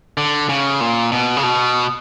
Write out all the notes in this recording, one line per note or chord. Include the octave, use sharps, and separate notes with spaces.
D3
C#3
A#2
B2
C#3
B2